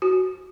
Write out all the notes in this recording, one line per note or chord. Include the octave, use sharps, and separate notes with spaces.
F#4